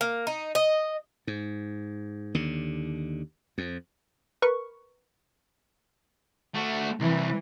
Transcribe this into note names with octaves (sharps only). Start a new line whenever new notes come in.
A#3
D#4
D#5
G#2
D#2 D3
F2
A#4 B4 C#6
A3 F#4
C2 E3